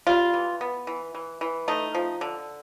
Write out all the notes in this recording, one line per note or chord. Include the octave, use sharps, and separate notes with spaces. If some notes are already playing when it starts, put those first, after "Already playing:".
G3 F4
E3
B3
E3
E3
E3
A3 D#4
F3
D3